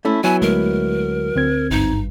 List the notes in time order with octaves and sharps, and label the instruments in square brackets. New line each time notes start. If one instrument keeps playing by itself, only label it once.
[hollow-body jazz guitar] A3 C#4 E4
[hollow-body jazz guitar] F#3 B3 E4 [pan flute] G#5
[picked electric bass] D2 G#3 A3 [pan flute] A#4
[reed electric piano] D2 C4 G#6
[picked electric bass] G#1 G2 [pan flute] D#4